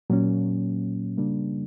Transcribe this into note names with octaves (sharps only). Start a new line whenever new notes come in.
A#2 F#3 A#3 C#4
C#3 G3 A#3 D4